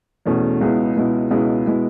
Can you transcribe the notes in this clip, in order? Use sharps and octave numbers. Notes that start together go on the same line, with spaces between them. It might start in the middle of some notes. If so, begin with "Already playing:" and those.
E2 B2 A3 C#4
C#2 B2 G#3 B3 E4
C#2 B2 G#3 B3 E4
C#2 B2 G#3 B3 E4
B2 G#3 B3 E4